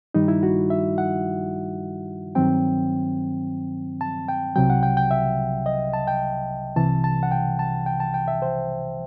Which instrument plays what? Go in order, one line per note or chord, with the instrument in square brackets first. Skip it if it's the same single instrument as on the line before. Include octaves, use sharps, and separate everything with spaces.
[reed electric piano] G2 D#3 G3 D#4
E4
F#4
E5
F#5
G2 D#3 F#3 C4 G5
A5
G5
C2 C3 F#3 G5
F#5
G5
G5
E5
D#5
A5
G5
C2 C3 E3 A5
A5
F#5
G5
A5
G5
A5
G5
E5
C5